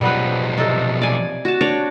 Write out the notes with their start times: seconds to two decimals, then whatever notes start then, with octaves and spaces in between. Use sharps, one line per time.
0.01 B1 F3 G3 B3 B4
0.58 C3 D#4 A4
1.01 D5 G#5
1.45 F#4 A5
1.61 D4 C#5 D5